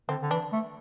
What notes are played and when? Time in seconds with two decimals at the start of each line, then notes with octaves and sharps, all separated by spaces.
0.09 D3 C4
0.22 D3
0.31 E3 D4
0.52 A3